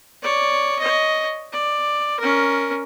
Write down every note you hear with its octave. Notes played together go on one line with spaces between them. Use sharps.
C#5 D5
C#5 D#5
D5
C#4 A#4